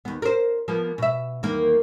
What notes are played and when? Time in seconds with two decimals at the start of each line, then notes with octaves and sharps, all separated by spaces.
0.05 D#2 B3
0.22 A#4 C5
0.68 F3 A#3 B3
0.98 B2 E5
1.43 E2 D#3 A#3